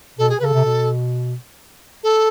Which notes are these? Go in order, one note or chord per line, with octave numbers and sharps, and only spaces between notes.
B2 A4
G#4
C#3 A4 B4
C3
B2
A4